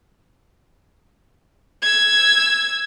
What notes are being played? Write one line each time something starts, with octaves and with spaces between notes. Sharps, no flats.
E6 G#6